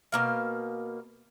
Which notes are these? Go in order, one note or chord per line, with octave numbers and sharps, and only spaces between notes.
B2 A#3 F5